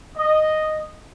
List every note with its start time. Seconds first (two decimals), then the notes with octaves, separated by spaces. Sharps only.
0.18 D#5